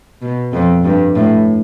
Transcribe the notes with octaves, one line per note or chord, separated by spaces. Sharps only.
B2
F2
G2
A2